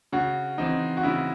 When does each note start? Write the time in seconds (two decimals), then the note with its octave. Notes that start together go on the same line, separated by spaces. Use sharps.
0.13 C#3 F#4
0.58 E3 C4 D#4
0.97 F#4
1.03 C#3 E4